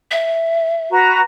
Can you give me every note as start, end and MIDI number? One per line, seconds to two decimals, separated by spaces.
0.11 0.88 76
0.90 1.20 66
0.90 1.20 71
0.90 1.20 82